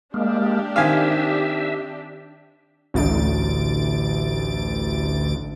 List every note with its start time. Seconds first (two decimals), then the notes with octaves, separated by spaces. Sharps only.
0.14 G#3 A#3 D4 G4
0.76 D#3 C4 E5 F5 G#5
2.94 A1 D2 A6 D7